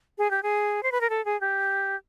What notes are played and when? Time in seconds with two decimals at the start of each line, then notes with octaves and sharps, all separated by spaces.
0.18 G#4
0.31 G4
0.43 G#4
0.83 C5
0.92 B4
1.01 A#4
1.10 A4
1.25 G#4
1.41 G4